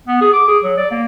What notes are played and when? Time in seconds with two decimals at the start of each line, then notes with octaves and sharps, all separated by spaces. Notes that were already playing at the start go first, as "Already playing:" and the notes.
0.07 B3
0.21 G#4
0.33 D6
0.48 G#4
0.64 F#3
0.77 D5
0.91 A#3